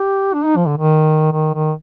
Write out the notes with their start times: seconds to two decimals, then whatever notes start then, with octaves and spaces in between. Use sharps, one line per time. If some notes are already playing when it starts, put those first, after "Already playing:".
Already playing: G4
0.34 D4
0.45 D#4
0.56 F3
0.67 D3
0.77 D#3
1.32 D#3
1.54 D#3